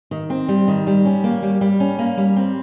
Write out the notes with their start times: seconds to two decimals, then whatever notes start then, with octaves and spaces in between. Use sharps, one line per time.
0.11 D#3
0.30 C4
0.49 G3
0.68 D#3
0.87 G3
1.05 C#4
1.24 A#3
1.42 G3
1.61 G3
1.80 C#4
1.99 A#3
2.17 G3
2.36 C4